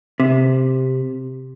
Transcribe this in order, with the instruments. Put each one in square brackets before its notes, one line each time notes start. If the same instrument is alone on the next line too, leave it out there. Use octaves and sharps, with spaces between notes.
[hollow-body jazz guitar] C3